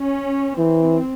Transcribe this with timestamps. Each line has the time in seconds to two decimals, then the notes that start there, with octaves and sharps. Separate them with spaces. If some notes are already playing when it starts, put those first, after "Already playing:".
Already playing: C#4
0.58 E3 C4